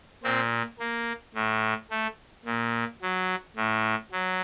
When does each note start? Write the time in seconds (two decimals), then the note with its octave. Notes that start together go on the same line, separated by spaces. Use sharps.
0.23 A#2 C4
0.79 A#3
1.35 A2
1.91 A3
2.45 A#2
3.02 F#3
3.56 A2
4.12 F#3